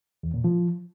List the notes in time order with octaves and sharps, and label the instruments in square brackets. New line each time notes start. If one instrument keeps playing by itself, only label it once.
[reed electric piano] E2
A#2
F3